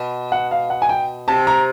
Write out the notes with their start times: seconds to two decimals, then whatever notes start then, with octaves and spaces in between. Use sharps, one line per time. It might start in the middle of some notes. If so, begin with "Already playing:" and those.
Already playing: B2
0.32 F#5
0.51 F5
0.70 F#5
0.82 G#5
0.89 G5
1.28 C3 A5
1.47 A#5